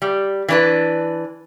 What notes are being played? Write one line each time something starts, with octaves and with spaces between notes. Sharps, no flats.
G3
E3 D4 B4